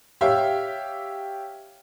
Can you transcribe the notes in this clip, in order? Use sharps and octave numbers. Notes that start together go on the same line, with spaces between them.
G4 C#5 E5 F5